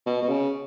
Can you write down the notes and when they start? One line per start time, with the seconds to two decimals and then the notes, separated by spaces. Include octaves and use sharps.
0.06 B2
0.22 B2
0.29 C#3